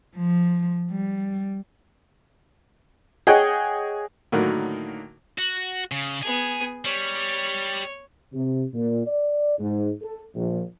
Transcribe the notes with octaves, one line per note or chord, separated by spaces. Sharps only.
F3
G3
G#4 C#5 D#5 F#5 G5
A2 D3 D#3 F#3 A#3 F#4
F#4
C#3
B3 G#4 G#5
G3 C#5
C3
A#2
D5
G#2
A4
A#1